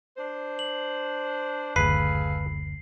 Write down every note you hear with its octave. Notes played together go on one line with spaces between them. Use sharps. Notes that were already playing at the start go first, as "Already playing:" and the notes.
D4 C5
F#7
F#1 D2 G#4 A4 B4 F5 C7